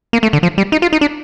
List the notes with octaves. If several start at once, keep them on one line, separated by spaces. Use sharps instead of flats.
A#3
A3
D3
F3
G3
D#4
F4
D#4
D4